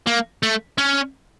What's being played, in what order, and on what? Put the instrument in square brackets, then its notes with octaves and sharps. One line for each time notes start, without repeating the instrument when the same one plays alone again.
[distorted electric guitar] A#3
A3
C#4